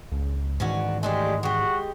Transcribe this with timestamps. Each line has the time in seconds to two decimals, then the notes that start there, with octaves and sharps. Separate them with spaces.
0.12 C#2
0.60 G#2 D#3 E3 C#4 D4 F#4
1.03 G#3 A3 D4 G4
1.43 G#3 F#4 G4